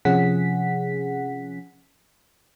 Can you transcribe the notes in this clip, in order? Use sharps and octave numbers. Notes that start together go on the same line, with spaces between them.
C3 F3 C#4 G#4 F#5 B6